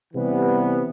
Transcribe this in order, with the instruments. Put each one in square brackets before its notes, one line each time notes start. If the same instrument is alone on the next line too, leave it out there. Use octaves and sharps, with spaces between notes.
[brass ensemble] C3 E3 G3 B3